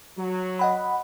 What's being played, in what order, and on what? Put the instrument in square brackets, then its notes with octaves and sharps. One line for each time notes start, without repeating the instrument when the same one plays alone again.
[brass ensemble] F#3
[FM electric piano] D#5 F#5 B5